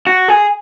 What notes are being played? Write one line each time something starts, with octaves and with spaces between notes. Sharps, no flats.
F#4
G#4